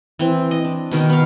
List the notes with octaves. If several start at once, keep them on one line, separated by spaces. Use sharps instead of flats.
E3 C4
D#5
D4
B2 D#3 A#4
B3 F5